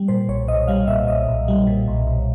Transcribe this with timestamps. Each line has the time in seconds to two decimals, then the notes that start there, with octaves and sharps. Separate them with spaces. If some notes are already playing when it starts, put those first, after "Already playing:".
Already playing: G3
0.08 A#2 C5
0.28 B1 C#5
0.48 B1 D#5
0.67 G3 F5
0.87 A#2 E5
1.08 B1 D#5
1.28 B1
1.48 G3
1.67 A#2
1.88 B1
2.07 B1